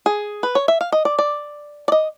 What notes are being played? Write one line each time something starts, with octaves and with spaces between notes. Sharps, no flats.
G#4
B4
C#5
E5
F5
D#5
D5
D5
D5
D#5